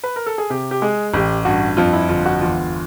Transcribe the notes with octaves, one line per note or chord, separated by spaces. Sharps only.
B4
A#4
A4
G#4
C3 G4
G4
G#3 G#4
A1 G4
G2 F#4
F2 F4
E4
G1 F4
F#4
E2 F4